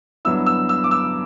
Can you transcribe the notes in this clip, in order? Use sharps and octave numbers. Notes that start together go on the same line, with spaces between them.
G2 F#3 B3 E4 E6
E6
E6
D6
E6